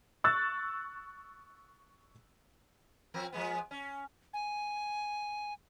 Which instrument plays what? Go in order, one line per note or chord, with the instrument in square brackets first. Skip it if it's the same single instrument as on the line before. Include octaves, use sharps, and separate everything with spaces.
[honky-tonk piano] C#6 E6 F#6 A6
[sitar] F3 C4 A#4
F3 G#3 B3
C#4
[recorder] G#5